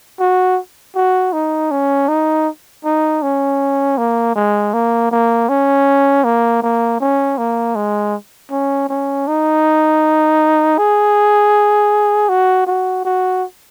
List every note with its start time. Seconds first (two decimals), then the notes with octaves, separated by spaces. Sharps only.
0.20 F#4
0.96 F#4
1.33 D#4
1.71 C#4
2.08 D#4
2.84 D#4
3.22 C#4
3.98 A#3
4.36 G#3
4.74 A#3
5.11 A#3
5.49 C#4
6.24 A#3
6.62 A#3
7.00 C#4
7.38 A#3
7.76 G#3
8.51 C#4
8.89 C#4
9.27 D#4
10.78 G#4
12.29 F#4
12.67 F#4
13.05 F#4